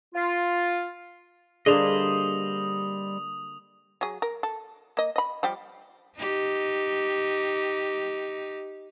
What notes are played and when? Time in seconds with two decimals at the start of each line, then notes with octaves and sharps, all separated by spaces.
0.15 F4
1.66 D3 G3 A#3 G#4 C5 D#5 D#6 F7
4.01 F#3 G#4
4.22 A#4
4.43 A4
4.97 A#3 D#5
5.16 D#5 B5
5.43 F3 G3 G4
6.18 D#4 G4